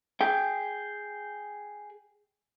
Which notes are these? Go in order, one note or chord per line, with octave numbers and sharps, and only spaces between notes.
G#4 G5